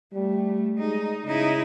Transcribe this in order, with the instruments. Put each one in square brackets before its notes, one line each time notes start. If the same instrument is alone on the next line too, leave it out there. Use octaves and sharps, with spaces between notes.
[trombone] G3 [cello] A3
[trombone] G#3 [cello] D#4
[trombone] C#3 [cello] D#4 E4